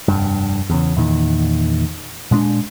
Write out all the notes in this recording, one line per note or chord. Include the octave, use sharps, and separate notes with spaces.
F1 G2
E2 C#3
E2 A#2 D#3
A#2 G#3 C4 D4